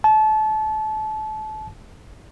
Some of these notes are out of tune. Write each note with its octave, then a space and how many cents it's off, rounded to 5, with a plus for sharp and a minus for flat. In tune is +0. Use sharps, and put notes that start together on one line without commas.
A5 -30